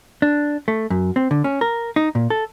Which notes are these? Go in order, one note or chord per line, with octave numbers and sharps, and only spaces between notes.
D4
A3
F#2
C4
D3
C#4
A#4
D#4
A#2
A4